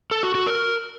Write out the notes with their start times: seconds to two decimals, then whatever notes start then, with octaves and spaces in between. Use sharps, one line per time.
0.11 A4
0.23 F#4
0.35 F#4
0.47 A#4